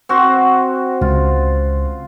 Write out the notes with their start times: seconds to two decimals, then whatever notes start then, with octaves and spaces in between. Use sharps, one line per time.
0.09 C4 F#4
1.01 C#2 F4